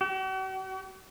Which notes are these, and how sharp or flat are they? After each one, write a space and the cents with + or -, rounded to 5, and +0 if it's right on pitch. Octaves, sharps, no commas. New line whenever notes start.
F#4 +45